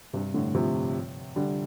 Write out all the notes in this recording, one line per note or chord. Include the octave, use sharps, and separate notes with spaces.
G2 C3
A2 D3
C3 F3
D3 G3